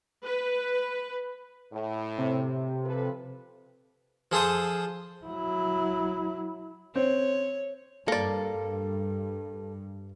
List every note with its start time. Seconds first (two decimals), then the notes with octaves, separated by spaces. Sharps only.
0.25 B4
1.73 A2
2.18 C3
2.85 F3 A4 B4
4.32 F3 G#4 A4 C5 D#6
5.26 F#3 E4
6.96 C4 C#5
8.08 G2 A#3 A4 D5